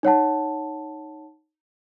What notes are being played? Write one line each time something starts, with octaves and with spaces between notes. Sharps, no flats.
D#4 C#5 F#5 A5